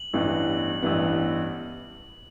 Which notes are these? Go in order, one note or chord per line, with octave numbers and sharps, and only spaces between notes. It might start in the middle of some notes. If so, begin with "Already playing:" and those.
Already playing: F#7
A1 G2 E3 B3
A1 G2 E3 B3